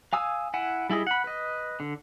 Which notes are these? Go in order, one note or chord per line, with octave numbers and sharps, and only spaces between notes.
F5 G#5 D#6 E6
E4 F#5 G#5
G3 E4 G#4 D#5
F#5 B5
B4 D#5
D3